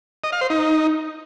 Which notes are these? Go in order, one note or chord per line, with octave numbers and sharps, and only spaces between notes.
D#5
F5
C5
D#4